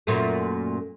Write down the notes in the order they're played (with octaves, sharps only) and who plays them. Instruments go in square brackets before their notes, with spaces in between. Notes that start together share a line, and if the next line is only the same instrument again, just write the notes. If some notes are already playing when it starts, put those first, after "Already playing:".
[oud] F#2 A#2 A3